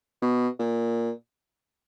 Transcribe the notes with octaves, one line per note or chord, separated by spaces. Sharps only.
B2
A#2